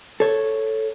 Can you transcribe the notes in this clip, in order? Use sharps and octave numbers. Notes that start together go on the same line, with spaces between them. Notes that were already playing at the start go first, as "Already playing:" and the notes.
A4 C#5